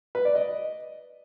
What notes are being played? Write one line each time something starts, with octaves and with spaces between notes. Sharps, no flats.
B4
D5
D#5